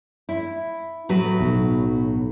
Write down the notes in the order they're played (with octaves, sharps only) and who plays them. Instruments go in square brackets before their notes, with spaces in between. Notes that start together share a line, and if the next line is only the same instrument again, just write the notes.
[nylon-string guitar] E4
A2 F#3 B4
[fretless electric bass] B1